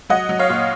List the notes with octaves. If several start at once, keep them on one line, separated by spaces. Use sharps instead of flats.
F#3 D#5 F#5
F#3
C#5 F5
A#2